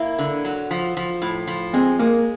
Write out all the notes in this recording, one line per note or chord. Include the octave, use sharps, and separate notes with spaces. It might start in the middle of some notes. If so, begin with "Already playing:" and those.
Already playing: A#3 E4
D3
F#3
F3
F3
A2
F3
G#3 C4
G#3 A#3